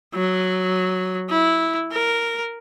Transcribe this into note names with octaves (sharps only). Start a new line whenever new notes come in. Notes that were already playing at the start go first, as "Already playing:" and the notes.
F#3
E4
A#4